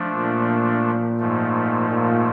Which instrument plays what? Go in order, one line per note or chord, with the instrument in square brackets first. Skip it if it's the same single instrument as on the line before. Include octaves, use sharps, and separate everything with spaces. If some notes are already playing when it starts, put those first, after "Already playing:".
Already playing: [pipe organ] F3 A3 D4
[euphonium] A#2
[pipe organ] G#2 F3 A3
[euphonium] A#2